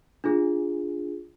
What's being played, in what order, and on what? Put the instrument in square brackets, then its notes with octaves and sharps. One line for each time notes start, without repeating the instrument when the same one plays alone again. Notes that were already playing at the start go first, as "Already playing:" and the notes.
[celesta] D4 F4 G#4